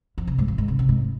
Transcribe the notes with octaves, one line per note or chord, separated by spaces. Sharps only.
F2
C3
G#2
F2
G#2
C3
C3
G#2